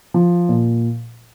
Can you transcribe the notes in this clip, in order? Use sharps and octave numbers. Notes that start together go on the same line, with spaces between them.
F3
A#2